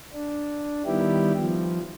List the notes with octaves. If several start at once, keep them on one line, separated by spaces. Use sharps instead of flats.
D4
D#3 G3 B3 E4 G4
F3